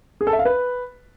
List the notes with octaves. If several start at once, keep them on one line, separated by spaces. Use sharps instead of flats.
G#4
A4
E5
F5
B4